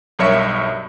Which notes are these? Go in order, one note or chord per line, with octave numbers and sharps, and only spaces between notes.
B1 G2 A#4 C#5 E5 C#7